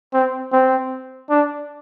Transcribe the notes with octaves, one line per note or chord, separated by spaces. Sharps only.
C4
C4
D4